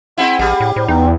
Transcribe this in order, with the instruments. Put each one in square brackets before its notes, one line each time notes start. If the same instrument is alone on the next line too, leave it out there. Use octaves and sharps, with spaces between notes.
[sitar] G#3 C4 E4 [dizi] F#5
[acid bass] A1 [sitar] G3 G#4
[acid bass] A2
[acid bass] A2 [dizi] C5
[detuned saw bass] E2 [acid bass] D#4 [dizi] G5